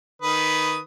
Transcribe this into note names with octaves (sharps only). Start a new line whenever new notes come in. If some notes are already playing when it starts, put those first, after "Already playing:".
D#3 B4 D#6